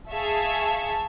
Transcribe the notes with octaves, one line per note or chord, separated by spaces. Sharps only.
G#4 E5 F5 A5 C#6